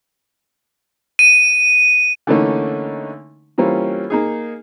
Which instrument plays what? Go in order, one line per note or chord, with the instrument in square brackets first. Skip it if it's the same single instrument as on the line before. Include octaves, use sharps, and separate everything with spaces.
[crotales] D#7
[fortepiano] D3 E3 A3 A#3 C#4 D#4
E3 G3 A#3 C4 C#4 F4
A#3 D#4 G#4